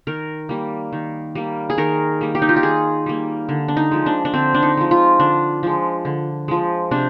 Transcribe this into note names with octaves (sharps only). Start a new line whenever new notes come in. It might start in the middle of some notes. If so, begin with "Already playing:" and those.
D#3 A#4
G3 A#3
D#3
G3 A#3
G#4
D#3 A#4
G3 A#3
G4
D#4
F4
G4
D#3 G#4
G3 A#3
D3
D4
D#4
F3 G#3
D4
D4
D3 C4
D4
D#4
F3 G#3
F4
D3 D4
F3 G#3
D3
F3 G#3
C3 D4